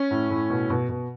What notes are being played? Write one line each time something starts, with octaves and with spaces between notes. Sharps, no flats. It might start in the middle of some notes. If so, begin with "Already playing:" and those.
Already playing: C#4
A2
A2
B2
B2
B2